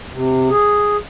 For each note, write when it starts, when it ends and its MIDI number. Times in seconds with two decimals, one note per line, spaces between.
0.12 0.50 48
0.50 0.97 68